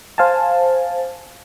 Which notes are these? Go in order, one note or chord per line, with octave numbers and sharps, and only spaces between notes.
C5 F5 G#5 A5